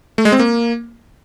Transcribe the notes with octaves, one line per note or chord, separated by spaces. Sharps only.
A3
G#3
C4
A#3